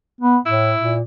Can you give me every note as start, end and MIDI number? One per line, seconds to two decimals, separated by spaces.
0.21 0.37 59
0.46 0.74 45
0.46 0.95 64
0.80 1.01 46